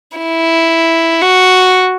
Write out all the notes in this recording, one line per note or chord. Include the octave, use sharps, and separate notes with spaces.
E4
F#4